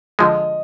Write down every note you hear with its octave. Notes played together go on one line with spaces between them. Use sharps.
D3 F3 G#3 D#5